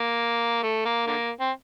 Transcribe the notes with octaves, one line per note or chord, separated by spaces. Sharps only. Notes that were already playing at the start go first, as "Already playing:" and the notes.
Already playing: A#3
A3
A#3
D3 A#3
C4